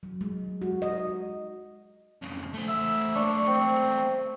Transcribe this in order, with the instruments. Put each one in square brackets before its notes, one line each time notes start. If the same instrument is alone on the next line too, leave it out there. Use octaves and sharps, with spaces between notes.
[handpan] F#3
G#3
F#4
D#5
[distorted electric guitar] F2 C#3
A3 C5
[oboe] E5
[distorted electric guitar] A3 A#3 [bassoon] D4 [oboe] C#6
[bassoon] C4